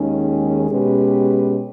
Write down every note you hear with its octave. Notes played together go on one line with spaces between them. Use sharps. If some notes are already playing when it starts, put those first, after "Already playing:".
Already playing: D#2 D#3 G#3 C#4 G#4
B2 G#3 C#4 G4 B4